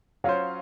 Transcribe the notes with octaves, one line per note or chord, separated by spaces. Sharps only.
F#3 C#4 F4 C5 C#5 F5